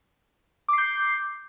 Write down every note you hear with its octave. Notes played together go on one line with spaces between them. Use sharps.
D6 G6 C7